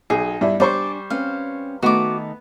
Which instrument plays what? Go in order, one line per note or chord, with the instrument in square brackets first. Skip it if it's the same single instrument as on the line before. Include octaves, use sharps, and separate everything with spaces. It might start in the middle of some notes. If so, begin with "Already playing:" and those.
[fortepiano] B1 [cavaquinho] G#4
[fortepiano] G2 D4 E4
[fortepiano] G3 C5 C#6 [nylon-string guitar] D4 G#5 [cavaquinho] D5
[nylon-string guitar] C4 C#4 B4 [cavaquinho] F5
[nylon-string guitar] D#3 A3 D#4 [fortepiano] B3 [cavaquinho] F#4 D6